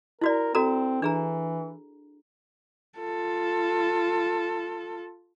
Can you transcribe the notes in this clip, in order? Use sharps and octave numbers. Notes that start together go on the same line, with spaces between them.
E4 F#4 A#4 D5
C4 F#4 A4 A#5
E3 D4 G#4 A#5
F4 A4